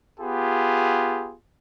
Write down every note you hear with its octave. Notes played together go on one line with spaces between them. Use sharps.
B3 F4 G4 G#4